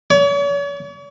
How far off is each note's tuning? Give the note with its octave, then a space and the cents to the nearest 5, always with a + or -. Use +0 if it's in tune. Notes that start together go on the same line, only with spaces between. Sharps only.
C#5 +40